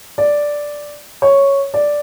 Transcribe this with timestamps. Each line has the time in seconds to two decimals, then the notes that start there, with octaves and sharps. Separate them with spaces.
0.18 D5
1.22 C#5
1.74 D5